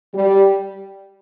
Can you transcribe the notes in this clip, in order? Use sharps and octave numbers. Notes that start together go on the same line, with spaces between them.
G3